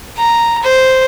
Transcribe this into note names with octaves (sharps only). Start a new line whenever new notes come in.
A#5
C5